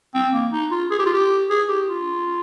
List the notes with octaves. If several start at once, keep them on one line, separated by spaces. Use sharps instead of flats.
C4
A#3
D#4
F4
G#4
G4
F4
G4
G#4
G4
F4